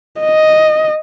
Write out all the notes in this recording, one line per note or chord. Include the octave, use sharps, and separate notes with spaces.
D#5